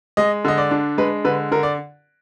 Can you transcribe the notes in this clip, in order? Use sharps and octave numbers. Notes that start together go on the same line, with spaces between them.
G#3 D#5
D3 D#5
D5
D4
G#3 B4
D3 B4
D3 A#4
D5